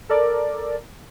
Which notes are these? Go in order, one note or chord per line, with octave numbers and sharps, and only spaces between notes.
A4 A#4 D5